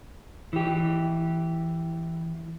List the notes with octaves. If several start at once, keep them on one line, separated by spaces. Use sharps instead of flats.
E3 G4